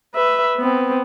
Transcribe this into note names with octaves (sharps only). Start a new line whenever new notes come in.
B4 E5
B3 C4